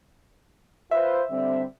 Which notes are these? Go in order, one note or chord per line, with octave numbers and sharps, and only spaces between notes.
F4 B4 C5 E5
D3 G3 C4